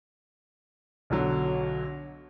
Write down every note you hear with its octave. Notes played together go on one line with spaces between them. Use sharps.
B1 D3 F#3